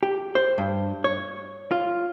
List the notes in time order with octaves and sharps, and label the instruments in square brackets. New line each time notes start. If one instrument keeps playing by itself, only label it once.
[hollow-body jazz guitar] G4
C5
G2
C#5
F4